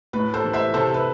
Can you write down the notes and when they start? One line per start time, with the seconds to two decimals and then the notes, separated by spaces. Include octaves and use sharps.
0.13 A2 B4
0.33 A4 C5
0.44 E3
0.53 C5 E5
0.74 C3 A4 C5
0.94 B4